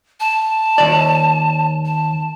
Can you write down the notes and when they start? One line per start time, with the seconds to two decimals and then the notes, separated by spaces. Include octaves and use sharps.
0.20 A5
0.78 D#2 C3 D5
1.85 A5